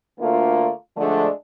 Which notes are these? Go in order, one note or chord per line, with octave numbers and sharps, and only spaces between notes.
D2 D3 A3 A#3 F4
D3 F3 G#3 A3 D4